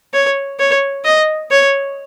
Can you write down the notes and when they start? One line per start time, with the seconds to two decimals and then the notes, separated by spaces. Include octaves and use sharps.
0.14 C#5
0.59 C#5
1.05 D#5
1.51 C#5